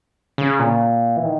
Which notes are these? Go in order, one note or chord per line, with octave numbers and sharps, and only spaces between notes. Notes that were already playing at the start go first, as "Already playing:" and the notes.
C#3
A#2
E3
D#3